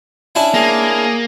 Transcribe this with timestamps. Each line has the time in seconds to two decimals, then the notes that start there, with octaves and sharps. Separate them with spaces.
0.35 C#4 D4 E4
0.54 A#3 G#4